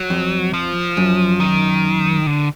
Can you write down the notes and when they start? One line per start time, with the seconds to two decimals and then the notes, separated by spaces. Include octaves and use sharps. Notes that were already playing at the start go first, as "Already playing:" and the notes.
Already playing: F#3
0.10 F2
0.54 F3
0.97 F#2
1.40 D#3
2.27 D3